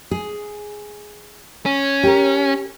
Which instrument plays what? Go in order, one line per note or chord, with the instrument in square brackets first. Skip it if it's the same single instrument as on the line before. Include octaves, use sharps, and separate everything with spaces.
[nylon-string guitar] G#4
[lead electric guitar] C#4
[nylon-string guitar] G4 A#4